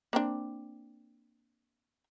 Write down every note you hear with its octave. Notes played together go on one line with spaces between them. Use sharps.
A#3 C4 D4